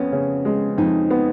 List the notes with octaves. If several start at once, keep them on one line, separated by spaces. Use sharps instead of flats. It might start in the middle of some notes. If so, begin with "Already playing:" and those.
Already playing: F2 B3 C#4
C#3
G#3
F2 D#4
B3